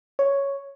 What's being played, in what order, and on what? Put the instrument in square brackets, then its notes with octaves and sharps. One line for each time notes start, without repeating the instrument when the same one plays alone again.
[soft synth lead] C#5